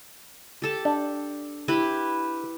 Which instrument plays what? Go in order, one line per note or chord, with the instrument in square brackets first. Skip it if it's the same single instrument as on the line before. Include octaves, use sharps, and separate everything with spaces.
[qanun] G4 A4 A5
[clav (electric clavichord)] D4
[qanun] E4 G4 B4